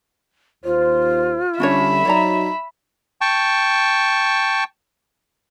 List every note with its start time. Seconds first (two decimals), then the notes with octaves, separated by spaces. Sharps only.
0.65 D#2 F4 C5
1.60 D3 G3 C#4 D4 C#5 E5 B5
2.05 F#3 D#4 C#5 D5 A#5
3.21 G5 A5 C#6